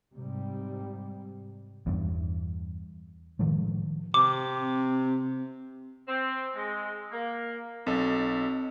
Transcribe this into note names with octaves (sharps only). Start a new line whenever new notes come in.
G#2 C3 G3
E2 G2
A2 D#3 F3 G#3
C3 C4 D6
C4
G#3
A#3
B1 C4 A4 D#5